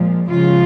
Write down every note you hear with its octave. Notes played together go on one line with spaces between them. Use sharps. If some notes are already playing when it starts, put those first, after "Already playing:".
Already playing: A#2 F3 G#3
C#3 F3 G#3 F4